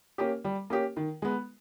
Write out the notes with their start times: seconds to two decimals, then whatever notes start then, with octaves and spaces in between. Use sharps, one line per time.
0.18 A#3 C#4 G4
0.44 G3
0.70 A#3 C#4 G4
0.97 D#3
1.22 G#3 B3